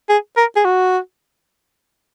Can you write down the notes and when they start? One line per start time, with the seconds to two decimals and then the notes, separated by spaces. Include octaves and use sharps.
0.09 G#4
0.37 A#4
0.56 G#4
0.64 F#4